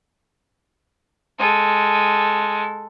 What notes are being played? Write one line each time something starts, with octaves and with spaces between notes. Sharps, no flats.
G#3 A4